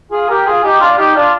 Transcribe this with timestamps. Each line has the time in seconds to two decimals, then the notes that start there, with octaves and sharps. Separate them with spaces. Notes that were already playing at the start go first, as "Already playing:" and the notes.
0.12 F4 G#4
0.29 G4 A#4
0.46 F4 G#4
0.63 D#4 G4
0.80 D4 F4
0.97 D#4 G4
1.15 D4 F4